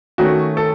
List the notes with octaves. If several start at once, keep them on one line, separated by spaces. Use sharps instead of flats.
D#3 A3 C#4 F#4
A4